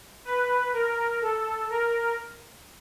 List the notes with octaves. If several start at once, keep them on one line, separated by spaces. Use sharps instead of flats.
B4
A#4
A4
A#4